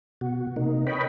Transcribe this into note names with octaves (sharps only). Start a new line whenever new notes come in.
B2 F#4
C3 A#3 D#4
A#4 B4 C#5 D#5 G5 B5